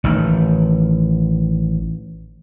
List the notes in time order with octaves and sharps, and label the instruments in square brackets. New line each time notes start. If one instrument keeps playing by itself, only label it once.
[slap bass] A1 D#3